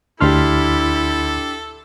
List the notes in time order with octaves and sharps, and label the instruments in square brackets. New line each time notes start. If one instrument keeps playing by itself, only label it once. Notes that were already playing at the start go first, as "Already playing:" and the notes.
[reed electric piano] D2 C6 F6 [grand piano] D4 G4 [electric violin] E4 [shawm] A4